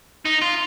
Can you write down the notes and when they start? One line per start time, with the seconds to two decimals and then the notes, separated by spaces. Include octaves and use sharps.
0.25 D#4
0.41 F4